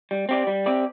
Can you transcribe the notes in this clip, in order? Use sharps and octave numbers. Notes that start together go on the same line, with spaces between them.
G3
C4 G4 D5
G3
C4 G4 D5